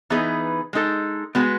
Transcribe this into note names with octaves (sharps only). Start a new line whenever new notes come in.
E3 B3 D#4 G#4 B4
G#3 D#4 A4
G#3 B3 F#4 B4